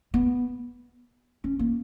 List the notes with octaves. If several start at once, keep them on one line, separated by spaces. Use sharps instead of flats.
B3
C#4
A#3